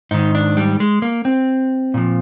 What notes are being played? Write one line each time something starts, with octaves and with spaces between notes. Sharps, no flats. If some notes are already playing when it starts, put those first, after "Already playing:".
G#2 D#3 D#4
D4
G3
G#3
A#3
C4
A#2 F3